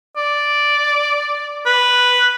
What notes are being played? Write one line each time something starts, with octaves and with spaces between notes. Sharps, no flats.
D5
B4